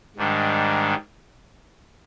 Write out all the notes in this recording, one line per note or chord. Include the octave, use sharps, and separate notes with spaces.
G#2 D#3 G3 D4